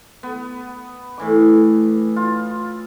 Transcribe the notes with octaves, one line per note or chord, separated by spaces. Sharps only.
B3
A2 E3 D6
F4